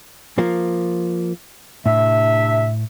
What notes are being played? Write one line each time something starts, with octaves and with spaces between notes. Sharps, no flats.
F3 A#3 F4
A2 C3 D4 E5